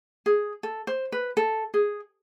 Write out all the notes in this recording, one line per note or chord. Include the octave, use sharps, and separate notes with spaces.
G#4
A4
C5
B4
A4
G#4